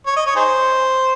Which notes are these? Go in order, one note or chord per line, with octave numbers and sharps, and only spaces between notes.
C#5
D#5
C#5
D#4 G#4 C5